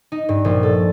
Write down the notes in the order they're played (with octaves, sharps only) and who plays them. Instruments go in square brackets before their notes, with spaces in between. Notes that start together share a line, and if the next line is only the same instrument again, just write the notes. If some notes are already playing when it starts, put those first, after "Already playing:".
[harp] D#4
G2
A#1
A4